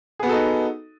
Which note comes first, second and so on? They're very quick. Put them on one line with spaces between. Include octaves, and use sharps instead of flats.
G#4 B3 F#4 A4 D#4